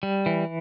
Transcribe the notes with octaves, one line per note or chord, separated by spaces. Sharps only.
G3
E3